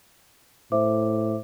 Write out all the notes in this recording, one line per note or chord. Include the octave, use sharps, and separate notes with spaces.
A2 C5 E5 D6